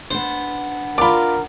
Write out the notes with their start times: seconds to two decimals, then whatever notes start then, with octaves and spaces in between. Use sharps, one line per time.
0.11 B3 D4 C5
0.98 F4 A#4 D5 B5 D6